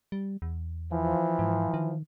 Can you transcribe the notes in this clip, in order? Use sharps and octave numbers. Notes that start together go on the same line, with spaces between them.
G3
E2
E3 F3
G#2
D#3